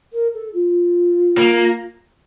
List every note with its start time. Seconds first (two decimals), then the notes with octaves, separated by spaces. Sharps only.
0.12 A#4
0.34 A4
0.54 F4
1.38 A#3